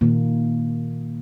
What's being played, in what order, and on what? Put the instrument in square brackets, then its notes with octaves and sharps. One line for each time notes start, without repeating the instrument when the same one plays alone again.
[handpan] A#2 D#3 A#3